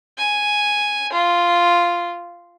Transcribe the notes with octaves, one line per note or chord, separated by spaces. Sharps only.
G#5
F4